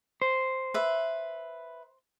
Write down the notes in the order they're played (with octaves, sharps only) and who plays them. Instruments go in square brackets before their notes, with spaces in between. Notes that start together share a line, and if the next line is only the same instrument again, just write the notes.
[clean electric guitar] C5
[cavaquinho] B4 E5